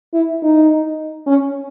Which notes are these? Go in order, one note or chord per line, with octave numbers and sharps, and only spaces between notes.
E4
D#4
C#4